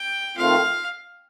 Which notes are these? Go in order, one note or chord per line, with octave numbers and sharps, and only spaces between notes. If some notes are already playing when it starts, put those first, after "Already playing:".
Already playing: G5
D#3 A3 C4 F4 F5